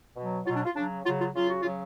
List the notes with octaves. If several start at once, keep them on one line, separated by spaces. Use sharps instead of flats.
B2
F#3
B2 F#3 F4
D4
F4
C#3 F#3 D4
C#3 F#3 F4
F4
C#3 F#3 F4
F#4
C#3 F#3 F4